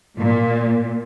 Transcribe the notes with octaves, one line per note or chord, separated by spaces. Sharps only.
A#2